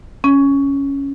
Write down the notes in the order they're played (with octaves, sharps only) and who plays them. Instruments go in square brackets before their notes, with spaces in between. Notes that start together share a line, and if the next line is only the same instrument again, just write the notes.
[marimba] C#4